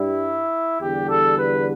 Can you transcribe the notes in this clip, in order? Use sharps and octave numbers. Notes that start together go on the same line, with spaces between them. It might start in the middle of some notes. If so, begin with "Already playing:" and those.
Already playing: G2 G3 E4
E2 D3 G3 G4
A4
B4